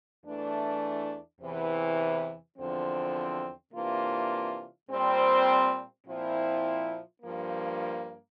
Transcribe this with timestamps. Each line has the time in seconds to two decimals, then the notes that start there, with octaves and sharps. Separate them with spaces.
0.24 E2 E3 A3 D4
1.41 E2 C3 E3
2.57 E2 D3 F3 C4
3.73 C3 E3 A#3 D4 F4
4.90 A#2 G3 C4
6.06 A#2 F3 C4 E4
7.22 G2 F3 A#3